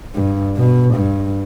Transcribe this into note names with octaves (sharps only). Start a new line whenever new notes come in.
G2
B2
G2